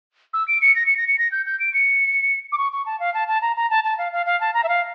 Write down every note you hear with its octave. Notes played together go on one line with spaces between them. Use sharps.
E6
D7
C#7
A#6
C#7
A#6
C#7
A#6
G6
G6
D7
C#7
D6
C#6
C#6
A5
F5
A5
A5
A#5
A#5
A5
A5
F5
F5
F5
A5
A#5
E5
F5